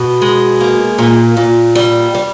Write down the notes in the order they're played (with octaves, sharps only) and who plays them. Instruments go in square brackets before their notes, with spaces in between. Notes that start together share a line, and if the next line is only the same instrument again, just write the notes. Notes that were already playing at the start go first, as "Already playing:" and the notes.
Already playing: [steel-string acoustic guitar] B2
G#3
A#3
A#2
A#2
G3
G3